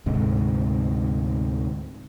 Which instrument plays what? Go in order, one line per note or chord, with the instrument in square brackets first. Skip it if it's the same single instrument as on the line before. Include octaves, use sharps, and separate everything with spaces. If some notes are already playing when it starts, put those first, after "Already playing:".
[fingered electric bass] D2 G#2 C3